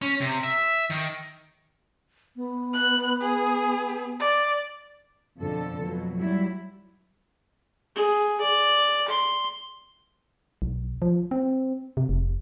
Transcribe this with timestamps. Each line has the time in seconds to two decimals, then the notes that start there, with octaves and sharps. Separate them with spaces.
0.02 C#4
0.21 C3
0.44 E5
0.90 D#3
2.36 B3
2.74 F#6
3.22 G#4
4.20 D5
5.40 F2 B2 D3 A4
5.80 F2 B2 F#3
6.17 F#3 G3 E4
7.96 G#4
8.41 D5
9.08 C6
10.62 B1
11.02 F3
11.31 C4
11.97 C3
12.09 F1